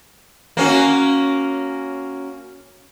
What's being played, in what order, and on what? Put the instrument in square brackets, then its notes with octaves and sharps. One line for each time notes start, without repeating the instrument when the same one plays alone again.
[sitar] A#3 C#4 F#4